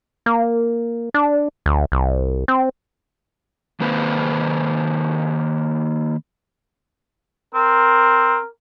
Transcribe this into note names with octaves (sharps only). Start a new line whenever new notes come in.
A#3
D4
D2
C2
C4
D#3 A#3 B4 C5
C4 A#4